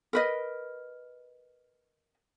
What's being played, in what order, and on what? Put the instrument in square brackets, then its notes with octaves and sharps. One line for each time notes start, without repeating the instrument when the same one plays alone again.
[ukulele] A#4 B4 D#5